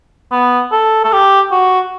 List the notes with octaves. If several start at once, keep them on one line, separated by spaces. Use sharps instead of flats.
B3
A4
A4
G4
F#4